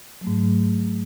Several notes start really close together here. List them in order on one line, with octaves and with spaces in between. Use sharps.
F#3 A3 G#2